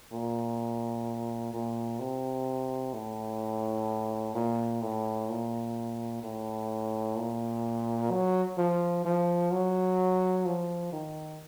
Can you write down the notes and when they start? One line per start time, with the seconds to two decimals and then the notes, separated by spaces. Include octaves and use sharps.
0.12 A#2
1.54 A#2
1.99 C3
2.93 A2
4.34 A#2
4.82 A2
5.29 A#2
6.23 A2
7.17 A#2
8.11 F#3
8.58 F3
9.05 F3
9.52 F#3
10.46 F3
10.92 D#3